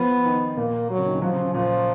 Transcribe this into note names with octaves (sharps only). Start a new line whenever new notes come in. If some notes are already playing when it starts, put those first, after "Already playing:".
Already playing: F3 B3
D#3
A#2 A#3
F#3
C#3
D#3
C#3
F3 F#3
C#3
C#3
A#2 F3